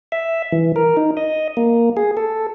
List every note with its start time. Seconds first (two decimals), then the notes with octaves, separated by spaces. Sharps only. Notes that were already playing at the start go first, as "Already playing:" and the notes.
0.12 E5
0.52 E3
0.76 A#4
0.97 D#4
1.17 D#5
1.57 A#3
1.97 G#4
2.17 A4